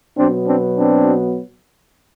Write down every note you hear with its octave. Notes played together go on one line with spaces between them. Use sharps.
B2 F#3 B3 C4 D4
C4 D4
C4 D4